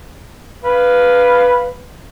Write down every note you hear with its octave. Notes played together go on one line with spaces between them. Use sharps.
B4 F5